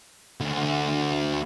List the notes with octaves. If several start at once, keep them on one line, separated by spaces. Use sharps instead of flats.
D2